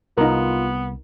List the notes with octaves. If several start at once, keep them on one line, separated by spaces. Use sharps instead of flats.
C2 B3 D#4 F4 A#4